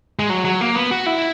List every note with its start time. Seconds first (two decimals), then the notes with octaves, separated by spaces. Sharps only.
0.19 G#3
0.30 F#3
0.45 F#3
0.61 A#3
0.75 B3
0.91 F#4
1.06 E4